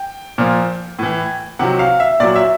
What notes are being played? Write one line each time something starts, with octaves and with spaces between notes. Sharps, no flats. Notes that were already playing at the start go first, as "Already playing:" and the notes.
Already playing: G5
A#2 F3
A2 E3
C3 D#3 F#3 F#5
F5
E5
A#2 F#3 D5
E5